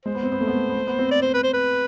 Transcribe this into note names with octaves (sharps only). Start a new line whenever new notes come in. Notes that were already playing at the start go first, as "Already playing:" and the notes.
G#3 C5
B3
C4
B3
A3
B3
A3
B3
A3
B3
C4
D5
C5
B4
C5
B4